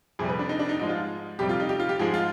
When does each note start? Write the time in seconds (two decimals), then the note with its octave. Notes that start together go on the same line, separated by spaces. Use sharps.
0.19 F2 C3 G3 G#4
0.29 B4
0.39 D4
0.49 D#4
0.59 D4
0.69 D#4
0.79 G#2 F3 G#3 D#4
0.89 F4
1.39 F2 C3 G3 G4
1.49 F4
1.60 D#4
1.69 G4
1.80 F4
1.89 G4
1.99 G#2 F3 G#3 G#4
2.14 F4